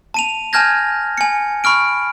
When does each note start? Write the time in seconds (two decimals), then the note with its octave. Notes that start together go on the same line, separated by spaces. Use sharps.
0.14 A5 D#7 F7
0.53 G#5 A5 F6 G6 G#6 A#6
1.18 G#5 C#7
1.64 B5 C#6 F6 D7